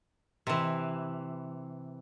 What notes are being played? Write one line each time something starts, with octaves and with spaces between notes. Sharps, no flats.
C3 E3